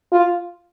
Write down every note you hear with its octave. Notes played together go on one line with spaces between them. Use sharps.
F4